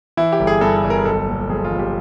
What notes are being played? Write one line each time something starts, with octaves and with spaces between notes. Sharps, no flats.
E3 E4
G4
G1
G#4
G2 A4
A4
G1
A#4
B1 A4
A#2
F3 G#4
F4
F3
G4